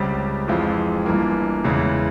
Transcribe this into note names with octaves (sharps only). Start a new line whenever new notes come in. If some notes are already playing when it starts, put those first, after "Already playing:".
Already playing: C#2 C#3 G3 C4 G4
F2 E3 G#3 C4 F4
G1 G2 E3 A#3
E2 C#3 E3 G#3 E4